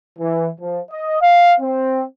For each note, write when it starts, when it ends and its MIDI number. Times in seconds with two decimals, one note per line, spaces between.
0.19 0.48 52
0.60 0.80 53
0.91 1.18 75
1.22 1.54 77
1.61 2.04 60